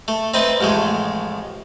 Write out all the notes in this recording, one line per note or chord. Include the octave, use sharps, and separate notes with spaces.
A3
C4 D#4 B4 E5 A5
A1 F2 G#3 A3